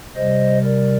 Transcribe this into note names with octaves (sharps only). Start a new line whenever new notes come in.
C3 G3 C5 D#5
A#4 D5